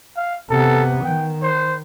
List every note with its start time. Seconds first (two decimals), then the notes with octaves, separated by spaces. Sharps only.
0.16 F5
0.50 C3 B3 A4
1.04 D#3 G5
1.43 C5